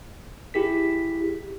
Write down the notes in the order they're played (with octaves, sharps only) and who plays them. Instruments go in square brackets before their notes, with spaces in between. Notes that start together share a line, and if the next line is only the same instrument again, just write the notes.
[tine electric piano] E4 G4 G#4 B6